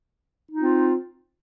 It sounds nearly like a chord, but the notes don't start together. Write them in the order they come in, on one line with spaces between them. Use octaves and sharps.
D#4 F4 C4